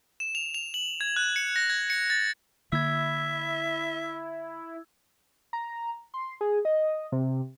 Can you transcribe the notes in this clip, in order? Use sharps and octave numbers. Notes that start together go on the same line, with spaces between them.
E7
F7
F7
F#7
G#6
F#6
C#7
A#6
G#6
C#7
A6
D3 A#3 E4 E5 E6 G#6
A#5
C6
G#4
D#5
C3